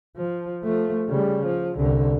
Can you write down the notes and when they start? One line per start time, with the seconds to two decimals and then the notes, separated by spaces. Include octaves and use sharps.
0.17 F3
0.63 F3 A3
1.09 C#3 G3
1.46 F3
1.77 C2 D3